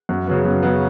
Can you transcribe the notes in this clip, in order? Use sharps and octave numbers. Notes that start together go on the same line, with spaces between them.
F#2
C#3 F#3 B3
F#2
C#3 F#3 B3